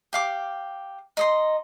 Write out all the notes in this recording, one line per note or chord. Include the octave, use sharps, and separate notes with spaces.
G4 F5 D6
D#4 D#5 C6